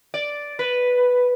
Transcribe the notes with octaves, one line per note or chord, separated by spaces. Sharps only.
D5
B4